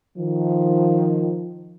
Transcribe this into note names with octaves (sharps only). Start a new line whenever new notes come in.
D#3 F3